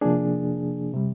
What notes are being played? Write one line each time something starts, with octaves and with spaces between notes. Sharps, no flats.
C3 F3 A#3 D4 G#4
C3 G3